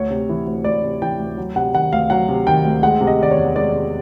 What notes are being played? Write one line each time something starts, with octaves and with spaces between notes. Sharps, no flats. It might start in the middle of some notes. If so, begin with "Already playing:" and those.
Already playing: D2 C#5
C3
E3
D2
D2 D5
C3
E3 G5
D2
F#3
C3 F#5
D#3 F#5
D2 F5
F#3 F#5
C3
D#3 G5
D2
G#3 F#5
C3
D#5
D#3 D5
C#5
E2
G#3 D5
C3